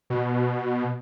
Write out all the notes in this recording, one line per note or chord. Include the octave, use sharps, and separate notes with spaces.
B2